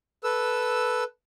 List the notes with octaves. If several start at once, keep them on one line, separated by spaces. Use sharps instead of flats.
A4 B4 E6